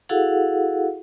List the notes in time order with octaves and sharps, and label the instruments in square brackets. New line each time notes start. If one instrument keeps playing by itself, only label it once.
[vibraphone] E4 F#4 G#4 A4 F5 F#5